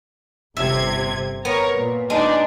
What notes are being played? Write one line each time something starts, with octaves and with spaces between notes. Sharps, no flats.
G1 C3 E5 G#6
B3 A#4 C#5
A#2
G#3 D4 D#4